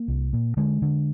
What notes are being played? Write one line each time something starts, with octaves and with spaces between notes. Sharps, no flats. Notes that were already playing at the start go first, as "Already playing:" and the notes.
Already playing: A#3
C2
A#2
D3 G#3
D3